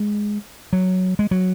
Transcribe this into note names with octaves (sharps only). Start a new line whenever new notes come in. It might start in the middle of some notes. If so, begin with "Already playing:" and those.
Already playing: G#3
F#3
G#3
F#3